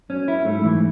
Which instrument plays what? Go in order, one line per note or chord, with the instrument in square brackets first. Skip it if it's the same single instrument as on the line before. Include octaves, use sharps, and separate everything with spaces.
[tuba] F#2 [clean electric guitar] C#4
[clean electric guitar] E4
[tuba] G#2 [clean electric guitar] A3
[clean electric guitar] E3